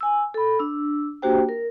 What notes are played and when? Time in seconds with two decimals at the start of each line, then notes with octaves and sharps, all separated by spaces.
0.01 G#5 E6
0.34 A4 B5
0.59 D4 E6
1.22 A#3 D4 F#4 G4 C5 G5
1.49 A#4